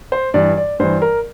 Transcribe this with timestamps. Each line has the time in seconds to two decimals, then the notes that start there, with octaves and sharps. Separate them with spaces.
0.12 C5
0.34 G2 E3 D5
0.57 D5
0.79 G2 E3 C5
1.02 A#4